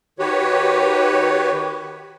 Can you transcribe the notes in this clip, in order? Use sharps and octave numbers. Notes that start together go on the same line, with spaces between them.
D#3 F#4 G4 B4 C#5